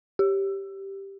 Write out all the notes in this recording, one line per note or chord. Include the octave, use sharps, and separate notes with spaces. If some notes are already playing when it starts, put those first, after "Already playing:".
G4